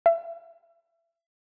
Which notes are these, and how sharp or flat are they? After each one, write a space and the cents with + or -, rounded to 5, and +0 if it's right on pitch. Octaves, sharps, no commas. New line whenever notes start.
E5 +30